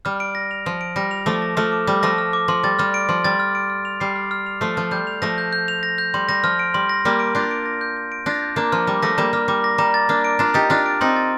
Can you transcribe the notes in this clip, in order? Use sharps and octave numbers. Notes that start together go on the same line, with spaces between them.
G3 F6
D7
A#6
F7
F3 F6
D7
G3 A#6
F7
F3 A3 D6
A#6
F3 A3 F6
D6
G3 D6
F3 A3 A#6
F6
D6
F3 C6
G3 A6
G3 F6
D7
F3 C6
G3 A6
F6
D7
F6
F7
G3 C7
F6
F6
F7
F3 A3 C7
F3 F6
G3 G6
F7
F3 A3 A#6
G6
G6
F7
A#6
G6
G3 C6
G3 A#6
F3 F6
D7
G3 C6
A#6
G3 A#3 F6
D7
D4 F4 G6
D7
A#6
G6
G6
D7
D4 F4 A#6
G6
A#3 D4 A#5
F3 F6
G3 D6
F3 A3 A#6
G3 A#3 A#5
G3 F6
G3 D6
A#6
G3 A#5
A6
A#3 D4 F6
D7
D4 F4 A#5
D#4 G4 A6
D4 F4 F6
D7
C4 D#4 C6
A6